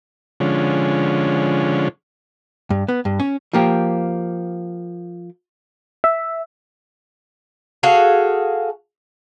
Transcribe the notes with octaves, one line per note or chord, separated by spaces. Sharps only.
D3 F3 G#3 C#4
G2
B3
G2
C#4
F3 A#3 G4
E5
F#4 G#4 A4 F5